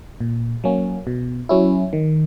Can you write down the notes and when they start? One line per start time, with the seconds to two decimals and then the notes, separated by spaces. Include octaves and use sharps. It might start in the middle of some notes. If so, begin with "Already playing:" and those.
0.20 A#2
0.64 F#3 A#3 C#4
1.07 B2
1.49 F#3 C#4 E4
1.93 D#3